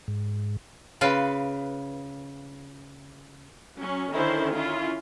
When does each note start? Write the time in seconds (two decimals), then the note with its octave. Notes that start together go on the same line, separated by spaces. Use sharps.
0.08 G#2
1.01 C#3 F4 B4 F5
3.79 F#3 C#4
4.11 D3 D#3 C#4 E4 C5
4.55 C#4 E4 F4